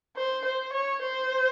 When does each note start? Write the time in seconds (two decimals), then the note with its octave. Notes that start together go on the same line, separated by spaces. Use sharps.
0.17 C5
0.45 C5
0.73 C#5
1.02 C5